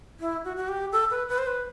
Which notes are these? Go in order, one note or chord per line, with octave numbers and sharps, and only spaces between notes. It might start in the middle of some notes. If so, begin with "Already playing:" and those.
E4
F#4
F#4
G4
A4
B4
B4
C5
B4